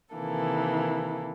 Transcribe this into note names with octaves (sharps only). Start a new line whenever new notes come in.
C3 D#3 E3 A#3 A4